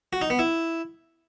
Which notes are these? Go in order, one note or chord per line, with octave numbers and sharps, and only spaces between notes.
F#4
D#4
B3
E4